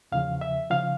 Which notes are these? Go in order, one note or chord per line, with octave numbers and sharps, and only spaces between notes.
E2 C#3 F3 F5
E5
C#3 F3 F5